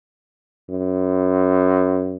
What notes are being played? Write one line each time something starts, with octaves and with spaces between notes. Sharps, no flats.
F#2